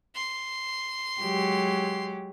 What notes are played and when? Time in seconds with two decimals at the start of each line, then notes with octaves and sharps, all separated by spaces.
0.15 C6
1.21 F#3 G#3 G4